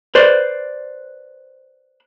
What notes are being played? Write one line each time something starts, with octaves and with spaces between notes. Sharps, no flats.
B4 C5 D5